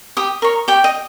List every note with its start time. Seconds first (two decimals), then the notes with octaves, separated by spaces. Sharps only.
0.17 G4 D#6
0.42 A#4 C#5
0.68 G4 G5
0.84 D#5